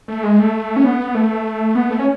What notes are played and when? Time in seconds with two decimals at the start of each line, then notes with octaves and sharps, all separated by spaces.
0.08 A3
0.23 G#3
0.39 A3
0.76 C#4
0.84 B3
1.15 A3
1.75 B3
1.91 A3
1.99 C#4